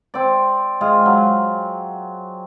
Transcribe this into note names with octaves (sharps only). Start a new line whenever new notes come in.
C4 D5
G#3 F4
F#3